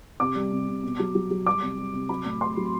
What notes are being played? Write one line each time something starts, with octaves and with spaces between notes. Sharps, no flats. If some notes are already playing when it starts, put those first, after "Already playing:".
C3 D6
G3
C3
C3
B2
F#3
F#3
F#3
G3 D6
C3
G3
C3
F#3 B5
A2
A2 C6
F#3